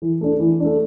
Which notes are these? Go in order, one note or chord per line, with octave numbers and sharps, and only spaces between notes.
E3
A3 D4
E3
A3 D4